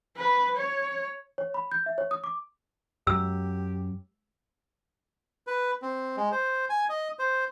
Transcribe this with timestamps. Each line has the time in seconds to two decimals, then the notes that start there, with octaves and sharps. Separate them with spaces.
0.17 B4
0.57 C#5
1.38 C#5
1.54 B5
1.71 G6
1.86 E5
1.98 C#5
2.11 D#6
2.24 D6
3.07 F#2 G4 E6
5.47 B4
5.82 C4
6.17 G#3
6.32 C5
6.70 G#5
6.89 D#5
7.19 C5